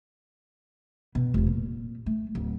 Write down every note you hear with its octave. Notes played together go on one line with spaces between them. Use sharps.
B2
F1 E2
A#2
A3
D1